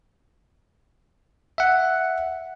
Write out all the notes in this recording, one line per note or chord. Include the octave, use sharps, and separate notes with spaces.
E5 F#5